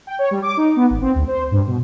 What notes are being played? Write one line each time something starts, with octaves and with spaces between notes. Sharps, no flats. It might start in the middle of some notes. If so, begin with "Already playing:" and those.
G5
C#5
G3
D6
D#4
B3
G#1
C4
D2
C5
G2
B2